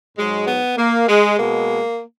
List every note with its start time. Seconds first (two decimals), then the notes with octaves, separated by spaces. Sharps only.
0.18 G#2 F#3 G#3
0.48 B3
0.78 A#3
1.08 G#3
1.37 B2 G#3 A#3